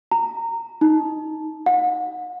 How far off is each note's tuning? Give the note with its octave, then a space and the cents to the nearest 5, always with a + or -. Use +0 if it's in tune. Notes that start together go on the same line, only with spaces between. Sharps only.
A#5 -20
D#4 +5
F#5 -40